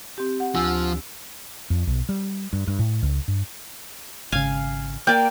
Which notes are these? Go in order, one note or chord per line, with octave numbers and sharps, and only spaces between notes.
C4 G4
F#5
D2 F3 G#5 E6
F2
B1
G3
G2
G2
A2
C#2
G2
G#1 C#3 F5 G#5
A#3 D5 G5